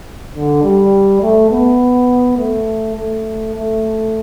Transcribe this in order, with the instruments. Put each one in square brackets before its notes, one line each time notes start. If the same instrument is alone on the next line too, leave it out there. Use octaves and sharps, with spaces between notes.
[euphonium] D3
G3
A3
B3
A3
A3
A3